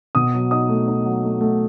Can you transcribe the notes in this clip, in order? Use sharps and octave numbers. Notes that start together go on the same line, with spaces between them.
B2 D#6
F#3
D#4 D#6
A3
D#4
F#3
A3
A3